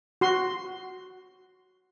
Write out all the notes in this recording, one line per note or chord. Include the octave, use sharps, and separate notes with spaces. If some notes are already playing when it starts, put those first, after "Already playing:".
F#4 C6